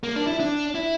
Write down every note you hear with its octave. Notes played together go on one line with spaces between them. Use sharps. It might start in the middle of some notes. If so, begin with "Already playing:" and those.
A#3
D4
E4
D4
E4